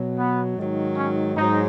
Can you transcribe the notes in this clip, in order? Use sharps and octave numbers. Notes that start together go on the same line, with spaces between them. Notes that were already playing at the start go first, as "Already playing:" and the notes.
Already playing: B2 F#3
B3
G#2 D#3 F#3
C#4
G#2 F#3 D#4